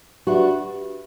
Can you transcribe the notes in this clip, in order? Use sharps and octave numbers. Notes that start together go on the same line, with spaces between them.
D4 F#4 G4 B4 E5 B5